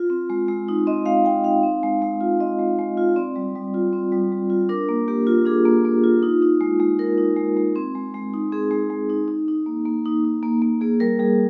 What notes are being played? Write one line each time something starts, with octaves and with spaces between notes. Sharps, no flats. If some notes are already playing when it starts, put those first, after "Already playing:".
Already playing: F4
C4
G#3
G#3
D#4
C4 D#5
G#3 F5
G#3 G5
D#4 F5
C4
G#3
G#3
F4
C4 D#5
G#3
G#3
F4
C4 D5
G3
G3
F4
C4
G3
G3
F4
D4 A#4
A#3
A#3 G4
F4
D4 G#4
A#3
A#3
F4
D#4
D#4
G#3
G#3
D#4 A#4
D#4
G#3
G#3
C4
G#3
G#3
D#4
C4 G#4
G#3
G#3
D#4
D#4
D#4
A#3
A#3
D#4
D#4
A#3
A#3
A#3 G#4
G3 A#4
G3 G#4